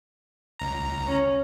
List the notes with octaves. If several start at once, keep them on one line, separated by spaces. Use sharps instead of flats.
C#2 A#5
C#4